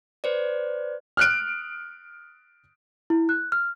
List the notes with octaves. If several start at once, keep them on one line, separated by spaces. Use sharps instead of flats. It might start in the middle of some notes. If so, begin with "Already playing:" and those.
B4 C5 D5
F6 F#6 D7
E4
F#6
F6